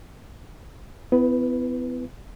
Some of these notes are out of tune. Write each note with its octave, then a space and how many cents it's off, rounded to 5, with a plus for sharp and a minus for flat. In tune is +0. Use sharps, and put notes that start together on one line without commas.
B3 +35 E4 +15 B4 +0